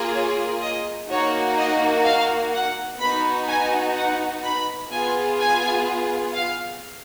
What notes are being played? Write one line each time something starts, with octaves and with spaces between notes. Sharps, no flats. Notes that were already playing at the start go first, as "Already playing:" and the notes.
Already playing: A#3 F4 G#4
C#5
D#5
A#3 D#4 F#4 C#5
D#5
F5
F#5
B3 D#4 F#4 B5
G#5
F#5
B5
B3 F4 G#4 G#5
G#5
F5